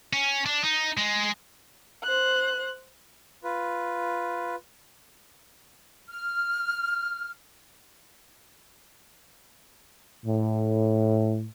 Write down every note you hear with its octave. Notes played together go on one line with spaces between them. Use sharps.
C#4
D4
D#4
G#3
C5 F#6
F4 B4
F6
A2